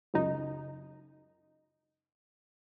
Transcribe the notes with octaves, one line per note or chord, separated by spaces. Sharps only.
C#2 F#2 D#4